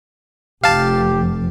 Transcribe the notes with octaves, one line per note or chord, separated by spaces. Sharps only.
F1 G4 F5 A5